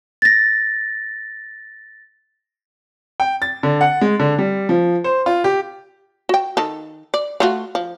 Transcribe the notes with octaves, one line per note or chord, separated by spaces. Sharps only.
A6 A#6
G5
A6
D3
F#5
G#3
D3
G3
F3
C5
F4
G4
F#4 G5
D#3 A4
D5
A3 F4 F#4
F3